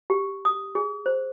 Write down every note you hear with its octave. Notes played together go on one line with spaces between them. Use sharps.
G4
D#6
G#4
C5